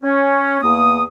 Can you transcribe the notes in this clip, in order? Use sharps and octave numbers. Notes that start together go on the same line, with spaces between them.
C#4
E2 A#3 D#6